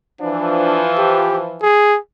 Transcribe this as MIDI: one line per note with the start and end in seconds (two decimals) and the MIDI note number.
0.21 1.68 52
0.21 1.68 53
0.21 0.83 62
0.98 1.37 67
1.62 1.98 68